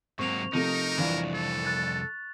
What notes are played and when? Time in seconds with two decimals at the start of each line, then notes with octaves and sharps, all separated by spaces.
0.19 G#2 F#3 A#3 C4 C#6 F7
0.53 C3 F3 A3 D#4 A#4
0.98 C2 F2 E3 D4 F4
1.34 A4
1.66 F#6 A6